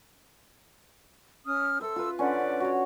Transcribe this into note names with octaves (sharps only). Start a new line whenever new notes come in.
C#4 D#6 F6
A4 C5 E5 E6
F4 B4
D3 C#4 B4 D5 F#5
F#4 C#5